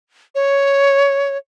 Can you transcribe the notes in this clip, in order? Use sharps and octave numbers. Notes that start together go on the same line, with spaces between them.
C#5